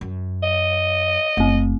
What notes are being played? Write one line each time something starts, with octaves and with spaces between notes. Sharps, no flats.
F#2
D#5
F#1 A3 C4